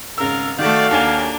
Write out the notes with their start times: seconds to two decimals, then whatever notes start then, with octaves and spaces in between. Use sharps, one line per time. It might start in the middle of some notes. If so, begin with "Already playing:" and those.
0.18 G#1 C#3 A#4 F5 E6
0.58 D#3 A3 F#4 A4 D5 F5
0.91 D#2 A#3 D4 G#5